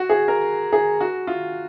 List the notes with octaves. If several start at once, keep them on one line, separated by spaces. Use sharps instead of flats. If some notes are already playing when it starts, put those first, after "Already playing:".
Already playing: F#4
G#4
A#4
G#4
F#4
F4